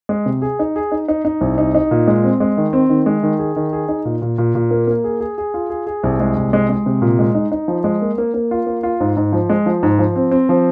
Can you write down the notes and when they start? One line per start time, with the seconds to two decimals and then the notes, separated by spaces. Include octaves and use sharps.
0.09 G#3
0.26 C3
0.42 G#4
0.59 D#4
0.76 G#4
0.92 D#4
1.08 D#4
1.25 D#4
1.41 C2
1.58 D#4
1.75 D#4
1.91 A#2
2.08 G#3
2.24 C4
2.40 G#3
2.57 D#3
2.73 C4
2.89 D#3
3.06 G#3
3.23 D#3
3.39 G#4
3.56 D#3
3.73 G#4
3.88 D#4
4.05 A#2
4.22 A#2
4.38 A#2
4.55 A#2
4.71 A#3
4.87 A#3
5.04 G#4
5.20 G#4
5.38 G#4
5.54 F4
5.70 G#4
5.86 G#4
6.03 C2
6.20 G#3
6.36 C2
6.53 G#3
6.70 G#3
6.86 C3
7.02 A#2
7.19 G#3
7.35 D#4
7.52 D#4
7.68 F3
7.84 G#3
8.02 A#3
8.18 A#3
8.34 A#3
8.51 F4
8.66 A#3
8.83 F4
9.00 G#2
9.17 G#2
9.32 F3
9.50 G#3
9.66 F3
9.83 G#2
9.99 F3
10.16 C4
10.31 C4
10.49 F3